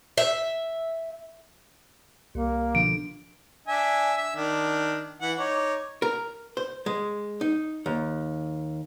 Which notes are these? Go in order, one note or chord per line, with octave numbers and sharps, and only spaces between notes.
E5
C2 A#3
B2 D3 F3 D7
D4 E5 G#5
E5
D#3 D4
E3 F#5
D#4 C#5 D6
A#4
C5
G#3
D#4
D#2